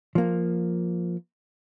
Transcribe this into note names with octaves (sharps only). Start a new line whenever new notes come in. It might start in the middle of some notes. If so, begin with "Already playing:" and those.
F3 A#3